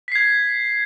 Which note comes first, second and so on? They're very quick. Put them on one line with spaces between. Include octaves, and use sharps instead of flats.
B6 C7 G#6